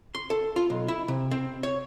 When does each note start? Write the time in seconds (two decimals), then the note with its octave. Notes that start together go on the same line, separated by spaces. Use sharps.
0.15 C6
0.30 A4
0.56 F4
0.70 B1
0.88 E4
1.08 C3
1.31 C4
1.63 C#5